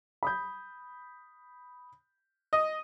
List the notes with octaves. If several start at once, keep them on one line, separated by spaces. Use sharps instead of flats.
B5 D#6 G6
D#5